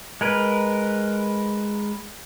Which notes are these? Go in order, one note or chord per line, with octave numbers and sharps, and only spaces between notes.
G#3 A#4 B4